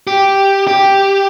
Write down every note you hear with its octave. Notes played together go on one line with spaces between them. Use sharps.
G4
G4